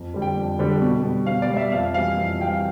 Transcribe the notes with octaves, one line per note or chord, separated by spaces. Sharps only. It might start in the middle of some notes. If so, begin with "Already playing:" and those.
Already playing: F2
D3 G3
G5
F2
D3 G3
B2
G3
B2 F5
D5
G3
E5
F2 F5
E3 G3 F5
F2
E3 G3 G5
F5